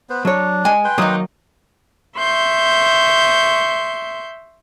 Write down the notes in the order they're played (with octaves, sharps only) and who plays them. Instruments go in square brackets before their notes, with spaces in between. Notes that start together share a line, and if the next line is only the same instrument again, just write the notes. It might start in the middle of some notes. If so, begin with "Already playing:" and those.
[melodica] B3 B4 C5
[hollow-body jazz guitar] F#3 C#5 [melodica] D4
[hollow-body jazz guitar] G#3 [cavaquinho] G#5
[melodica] B4 G5 C6
[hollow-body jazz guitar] D#3 F#3 A#3 [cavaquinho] D#4 D5 D#6
[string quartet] E5 C6 C#6 G6